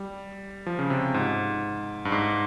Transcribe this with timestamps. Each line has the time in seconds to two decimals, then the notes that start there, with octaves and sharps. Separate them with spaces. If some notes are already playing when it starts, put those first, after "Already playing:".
Already playing: G3
0.66 F3
0.79 C#3
0.90 C3
1.14 G#2
2.05 G2
2.12 G#2